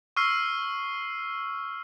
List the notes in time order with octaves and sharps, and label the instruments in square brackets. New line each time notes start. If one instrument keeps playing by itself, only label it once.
[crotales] C#6 E6 F6 C7